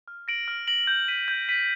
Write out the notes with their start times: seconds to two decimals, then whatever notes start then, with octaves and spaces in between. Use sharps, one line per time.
0.08 F6
0.28 A#6 D7 F#7
0.48 F6
0.67 A#6 D7 F#7
0.87 G6
1.08 B6 D#7 F#7
1.28 G6
1.48 B6 D#7 F#7